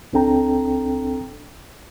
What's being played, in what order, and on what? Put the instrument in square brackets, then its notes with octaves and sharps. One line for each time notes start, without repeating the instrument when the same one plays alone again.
[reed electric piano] C#2 C4 D4 A4 G5 A#5